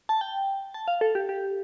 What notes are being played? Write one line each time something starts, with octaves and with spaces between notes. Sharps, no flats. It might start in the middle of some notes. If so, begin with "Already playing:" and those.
A5
G5
A5
F5
A4
G4
G4